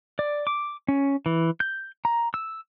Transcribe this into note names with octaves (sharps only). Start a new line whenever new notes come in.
D5
D6
C#4
E3
G6
A#5
E6